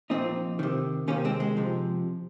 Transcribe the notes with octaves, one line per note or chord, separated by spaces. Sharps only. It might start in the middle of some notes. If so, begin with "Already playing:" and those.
A#2 F3 C4 D#4
C3 D#3
C3 D#3 A#3 C#4
G#3 C4
G#3
C3 F3